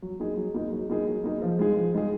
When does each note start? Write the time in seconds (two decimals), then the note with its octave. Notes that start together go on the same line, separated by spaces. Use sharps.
0.02 F#3
0.20 A#3 D#4 G#4
0.37 F#3
0.54 A#3 D#4 G#4
0.72 F#3
0.89 A#3 D#4 G#4
1.07 F#3
1.24 A#3 D#4 G#4
1.42 F3
1.59 G#3 D#4 G#4
1.77 F3
1.94 G#3 D#4 G#4